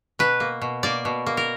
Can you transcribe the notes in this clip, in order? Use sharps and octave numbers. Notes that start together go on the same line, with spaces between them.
B2 B4
A#3
B2
A#3 D5
B2
A#3
A#4